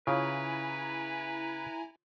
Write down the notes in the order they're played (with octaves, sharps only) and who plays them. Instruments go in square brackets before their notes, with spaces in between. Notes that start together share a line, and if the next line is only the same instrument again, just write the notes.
[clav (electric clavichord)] C#3 [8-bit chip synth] E4 G#5 A#5 [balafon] F4 C#5 F5 [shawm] B4